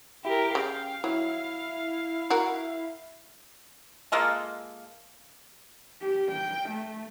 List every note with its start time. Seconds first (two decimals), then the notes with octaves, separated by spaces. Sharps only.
0.25 E4 G4 A#4
0.55 C#3 F5 G5
1.04 F#3 E4
2.30 F#4 A#4
4.12 G#3 A#3 F4 A4
6.02 G4
6.32 G5
6.70 A3